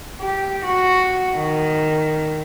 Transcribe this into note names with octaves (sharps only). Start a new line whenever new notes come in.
G4
F#4
D#3